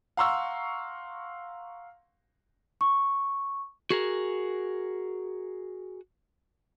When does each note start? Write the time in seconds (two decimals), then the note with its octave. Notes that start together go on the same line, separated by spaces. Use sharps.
0.17 F5 F#5 A#5 C6 C#6 E6
2.81 C#6
3.91 F#4 G#4 A#4